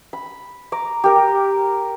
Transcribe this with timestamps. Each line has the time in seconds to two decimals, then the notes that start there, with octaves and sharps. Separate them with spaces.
0.13 B5
0.72 A#5 D6
1.04 G4 A#4